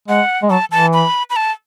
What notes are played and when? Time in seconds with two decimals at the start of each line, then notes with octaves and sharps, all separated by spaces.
0.08 G#3 F#5
0.43 G#3
0.50 F#3 A5
0.72 E3 A5
0.93 B5
1.30 B5
1.36 A5